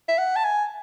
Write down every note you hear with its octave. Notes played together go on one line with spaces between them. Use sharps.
E5
F#5
A5
G#5